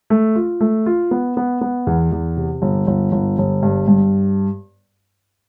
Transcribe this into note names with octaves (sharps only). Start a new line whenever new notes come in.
A3
F4
A3
F4
B3
B3
B3
E2
E2
C3
G1
G1
G1
G1
G2
G2